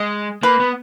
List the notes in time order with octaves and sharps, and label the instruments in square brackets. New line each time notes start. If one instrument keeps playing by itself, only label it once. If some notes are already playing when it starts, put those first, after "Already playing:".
Already playing: [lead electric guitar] G#3 [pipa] D#5
[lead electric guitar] A#3 [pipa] B4
[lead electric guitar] B3